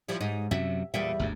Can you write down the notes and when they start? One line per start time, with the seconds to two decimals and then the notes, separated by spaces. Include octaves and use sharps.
0.09 F3 G3 E4
0.21 G#2 D#4
0.51 F#2 C3 F#3 E5
0.94 E2 A#2 G3 E5
1.19 G1 D2 G#2